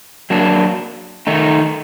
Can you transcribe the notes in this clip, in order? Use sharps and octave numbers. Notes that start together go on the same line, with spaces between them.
F#3 A#3 D4
D#3 A3 D#4